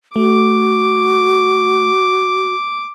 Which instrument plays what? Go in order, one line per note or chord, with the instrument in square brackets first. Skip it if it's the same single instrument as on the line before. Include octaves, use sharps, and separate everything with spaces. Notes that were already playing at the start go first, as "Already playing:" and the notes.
[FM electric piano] A3 [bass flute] F#4 [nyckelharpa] D6